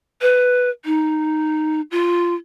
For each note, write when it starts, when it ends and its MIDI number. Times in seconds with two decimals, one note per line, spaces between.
0.22 0.70 71
0.85 1.81 63
1.91 2.34 65